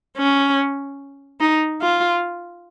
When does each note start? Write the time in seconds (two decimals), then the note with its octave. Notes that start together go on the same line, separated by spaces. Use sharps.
0.17 C#4
1.41 D#4
1.82 F4